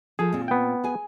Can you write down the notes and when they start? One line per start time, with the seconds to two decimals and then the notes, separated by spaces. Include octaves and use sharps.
0.19 F3 G#4 A4
0.33 A#2 C4
0.48 B3 G5
0.84 G#4 G#5